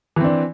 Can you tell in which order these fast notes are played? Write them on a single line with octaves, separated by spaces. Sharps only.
E3 C4 D4